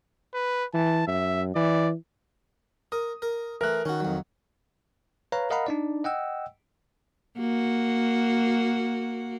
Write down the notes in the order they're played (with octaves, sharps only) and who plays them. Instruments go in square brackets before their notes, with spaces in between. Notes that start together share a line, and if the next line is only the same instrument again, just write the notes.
[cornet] B4
[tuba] E3 [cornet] A5
[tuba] F#2 [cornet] E5
[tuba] E3 [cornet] D5
[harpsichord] A#4 [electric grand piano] D#6
[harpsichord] A#4
[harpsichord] E3 A3 [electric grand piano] A#4 F#6
[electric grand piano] D#3 [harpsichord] C#4 F#4
[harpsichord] F2 F#3
[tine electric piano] B4 C#5 F5 A#5
A#4 D#5 F5 F#5 A#5 B5
D4 D#4 D5
D#5 F#5 G5 E6
[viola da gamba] A#3 F#4